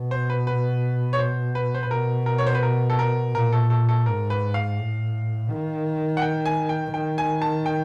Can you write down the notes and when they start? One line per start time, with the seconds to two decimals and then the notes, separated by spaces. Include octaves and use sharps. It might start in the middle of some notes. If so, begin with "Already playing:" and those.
Already playing: B2
0.11 C5
0.30 B4
0.47 B4
1.13 C#5
1.19 C5
1.55 B4
1.75 C5
1.83 B4
1.91 B2 A#4
2.26 A#4
2.38 C#5
2.46 C5
2.55 B4
2.63 A#4
2.90 A4
2.99 A#4
3.34 A#2 A#4
3.53 A4
3.70 A4
3.89 A4
4.06 G#2 A#4
4.30 B4
4.54 F5
4.79 A2
5.49 D#3
6.17 F#5
6.22 G5
6.46 G#5
6.69 G5
6.94 D#3 G5
7.18 G#5
7.42 A5
7.66 G5